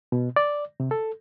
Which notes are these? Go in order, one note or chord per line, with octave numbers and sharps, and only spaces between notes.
B2
D5
C3
A4